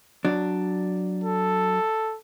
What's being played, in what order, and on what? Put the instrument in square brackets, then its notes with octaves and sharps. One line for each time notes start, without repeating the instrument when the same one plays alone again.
[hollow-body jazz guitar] F#3 D4
[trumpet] A4